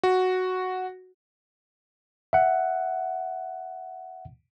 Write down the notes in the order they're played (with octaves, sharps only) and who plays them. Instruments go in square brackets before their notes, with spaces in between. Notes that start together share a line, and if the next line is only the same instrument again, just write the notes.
[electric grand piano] F#4
[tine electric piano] E5 F#5